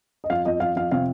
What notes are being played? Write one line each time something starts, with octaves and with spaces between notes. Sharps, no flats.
D#5
F2 F5
F2 D#5
F2 F5
F2 F5
C3 F5